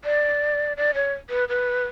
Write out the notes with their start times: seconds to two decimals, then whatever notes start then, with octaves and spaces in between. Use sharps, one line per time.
0.05 D5
0.77 D5
0.94 C#5
1.30 B4
1.49 B4